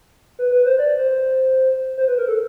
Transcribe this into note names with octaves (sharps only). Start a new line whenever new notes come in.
B4
B4
C5
D5
C5
C5
B4
A#4
A4